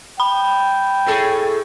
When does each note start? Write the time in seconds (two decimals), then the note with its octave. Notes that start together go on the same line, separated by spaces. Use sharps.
0.20 G5 B5
1.06 A2 G#4 A4